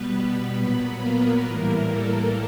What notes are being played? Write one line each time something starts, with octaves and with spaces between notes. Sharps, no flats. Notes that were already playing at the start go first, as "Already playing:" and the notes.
Already playing: B2 G3 B3 B4
B3 B4
A#2 F#3
A#3 A#4
A2 E3 G3
A4